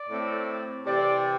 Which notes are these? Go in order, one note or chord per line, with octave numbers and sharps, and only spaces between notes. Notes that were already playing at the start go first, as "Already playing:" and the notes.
Already playing: D5
A2 A3 C4
C3 E3 C4 D5